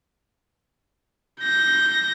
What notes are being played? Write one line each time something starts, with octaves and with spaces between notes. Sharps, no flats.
G6 A#6